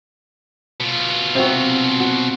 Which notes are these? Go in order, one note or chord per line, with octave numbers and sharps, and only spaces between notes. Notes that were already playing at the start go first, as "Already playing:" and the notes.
B2 F4
C3 F#4
F#4